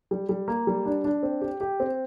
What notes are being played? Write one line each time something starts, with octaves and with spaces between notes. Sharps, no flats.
G3
G3
A#3
G3
D4
D4
C4
G4
G4
C4